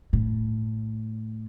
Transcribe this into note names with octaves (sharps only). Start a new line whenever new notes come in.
A2